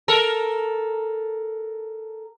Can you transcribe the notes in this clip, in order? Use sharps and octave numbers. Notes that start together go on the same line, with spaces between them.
A4 A#4